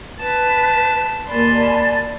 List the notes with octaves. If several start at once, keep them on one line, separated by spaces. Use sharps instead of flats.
B4 A5
D#2 A#3 D5 G#5 A5 B5 C6